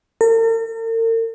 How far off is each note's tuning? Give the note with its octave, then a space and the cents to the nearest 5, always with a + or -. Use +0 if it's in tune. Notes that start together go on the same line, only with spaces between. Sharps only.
A#4 -45